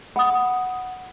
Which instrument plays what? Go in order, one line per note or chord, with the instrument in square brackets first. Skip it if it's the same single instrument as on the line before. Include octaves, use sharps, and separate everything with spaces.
[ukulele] F#5 [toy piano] B5 D#6